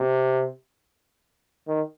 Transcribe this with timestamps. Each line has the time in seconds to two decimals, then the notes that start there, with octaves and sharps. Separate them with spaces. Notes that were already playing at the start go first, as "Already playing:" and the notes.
Already playing: C3
1.67 D#3